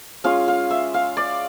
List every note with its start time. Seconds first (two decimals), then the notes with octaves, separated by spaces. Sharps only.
0.24 G#3 C#4 F4 F5
0.48 F5
0.70 E5
0.94 F5
1.17 D5